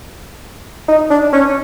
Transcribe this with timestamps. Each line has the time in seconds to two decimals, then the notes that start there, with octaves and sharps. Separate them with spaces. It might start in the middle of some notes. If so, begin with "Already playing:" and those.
0.88 D#4
1.10 D4
1.33 C#4